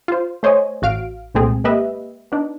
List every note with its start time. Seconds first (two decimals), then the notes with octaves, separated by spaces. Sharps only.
0.08 F4 C5
0.43 A3 C5 C#5 D#5 G#5
0.82 A1 F#4 F5 F6 D7
1.35 C2 A#2 G#3 A3 C4 G#4
1.64 G#3 A#3 G4 B4 D#5 E5
2.32 B3 D4 D#4